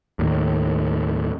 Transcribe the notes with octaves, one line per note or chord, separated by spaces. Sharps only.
D#2 A2 D#3